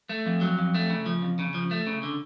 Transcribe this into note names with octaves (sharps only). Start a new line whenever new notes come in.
A3
F2
F#3
F2
A3
C#3
F3
F2
C#3
F3
A3
C#3
D3